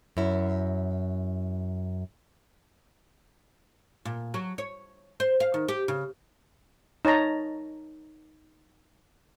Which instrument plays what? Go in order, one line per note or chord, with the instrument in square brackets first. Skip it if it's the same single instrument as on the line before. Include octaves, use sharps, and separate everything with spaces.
[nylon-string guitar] F#2 E4
[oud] A#2
F#3
C#5
C5
F5
D#3
G4
C#3
[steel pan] D#4 C#5 A5 A#5